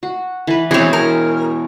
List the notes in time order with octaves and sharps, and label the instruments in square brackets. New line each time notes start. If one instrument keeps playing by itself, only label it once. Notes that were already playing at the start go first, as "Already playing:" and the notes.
[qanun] F#4
E3 B4
[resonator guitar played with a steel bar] E3 C4 [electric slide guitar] B3 E4 F#4 [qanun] G#4 C#5
[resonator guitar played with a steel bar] A#4